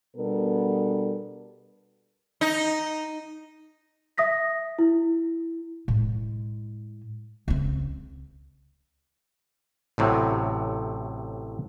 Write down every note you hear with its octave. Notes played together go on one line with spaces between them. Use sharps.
B2 G3 B3 D4 A4 A#4
D#4
E5 D#6 A#6 B6
E4
A2 G#3
C#2 C4
A1 A2 C3 F#3